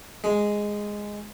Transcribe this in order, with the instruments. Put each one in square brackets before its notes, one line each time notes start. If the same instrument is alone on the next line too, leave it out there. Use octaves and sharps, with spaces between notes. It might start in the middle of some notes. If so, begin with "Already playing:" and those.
[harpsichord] G#3